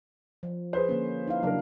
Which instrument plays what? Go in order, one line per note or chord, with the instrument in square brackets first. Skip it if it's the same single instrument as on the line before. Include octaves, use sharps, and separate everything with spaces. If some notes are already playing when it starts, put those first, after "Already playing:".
[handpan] F3
[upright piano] G#4 B4 C5
[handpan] D3 A#3 C#4
D#4 E4 F5
[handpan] C#3 F#3 [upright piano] D4 A#4